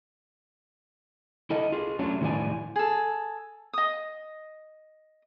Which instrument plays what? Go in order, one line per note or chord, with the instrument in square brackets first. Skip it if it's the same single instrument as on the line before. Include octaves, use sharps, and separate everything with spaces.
[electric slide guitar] E4 A4 D#5
F4 G#4
F#3 A3 C#4 D4
A2 D#3 F3 E4 D5 G#5
[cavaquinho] G#4 A4
D#5 D#6